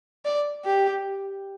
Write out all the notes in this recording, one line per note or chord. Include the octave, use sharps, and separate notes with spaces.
D5
G4